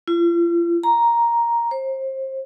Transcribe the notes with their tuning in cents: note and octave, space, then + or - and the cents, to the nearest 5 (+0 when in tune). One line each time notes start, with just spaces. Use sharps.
F4 -40
A#5 +5
C5 +30